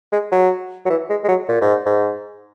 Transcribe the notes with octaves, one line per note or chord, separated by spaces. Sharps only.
G#3
F#3
F#3
E3
G#3
G#3
F#3
A#2
G#2
G#2